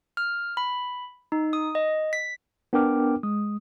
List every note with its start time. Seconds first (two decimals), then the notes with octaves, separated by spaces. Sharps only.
0.17 F6
0.57 B5
1.32 D#4
1.53 D#6
1.75 D#5
2.13 B6
2.73 B3 D4 A#4 G5 D6 F6
3.23 G#3 D#6